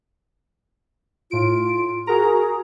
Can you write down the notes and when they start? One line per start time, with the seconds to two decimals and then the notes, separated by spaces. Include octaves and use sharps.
1.31 A2 F4 D7
2.07 F#4 G#4 A#4 A#5